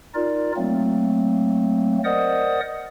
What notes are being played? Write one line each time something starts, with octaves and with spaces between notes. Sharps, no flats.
D#4 F4 A#4 D5
F#3 A3 A#3 C4
A#4 C5 D5 D#5 F#5 D#6